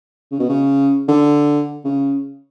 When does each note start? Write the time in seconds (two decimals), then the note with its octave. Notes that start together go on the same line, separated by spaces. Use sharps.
0.31 C#3
0.39 B2
0.49 C#3
1.08 D3
1.85 C#3